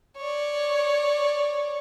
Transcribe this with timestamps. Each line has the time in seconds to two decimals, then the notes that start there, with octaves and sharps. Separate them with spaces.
0.17 C#5 D5